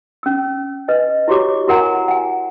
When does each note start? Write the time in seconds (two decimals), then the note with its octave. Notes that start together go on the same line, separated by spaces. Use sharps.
0.23 C#4 E6
0.88 B4 D#5 G#5
1.28 E4 F#4 G4 C#5 D6
1.67 E4 F#4 A#4 F#5 G#5 A#5
2.08 F#5 G#5